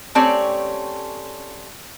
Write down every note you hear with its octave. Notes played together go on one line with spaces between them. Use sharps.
A3 C4 C#4 G4 C#5 D5